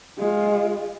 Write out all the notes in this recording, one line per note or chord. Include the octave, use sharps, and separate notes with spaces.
G#3 F4